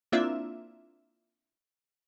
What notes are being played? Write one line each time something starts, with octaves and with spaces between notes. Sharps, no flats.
A#3 C4 D4 E4 F4 E5